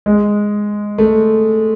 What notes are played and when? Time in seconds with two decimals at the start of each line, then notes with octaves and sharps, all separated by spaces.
0.06 G#3
0.98 A3